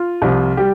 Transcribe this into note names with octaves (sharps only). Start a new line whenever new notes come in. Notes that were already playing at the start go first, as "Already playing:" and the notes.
Already playing: F4
C2 C3 F3
G3 G4